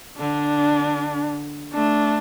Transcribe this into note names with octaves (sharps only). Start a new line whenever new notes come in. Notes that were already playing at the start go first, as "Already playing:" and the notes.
D3 D4
A3 D4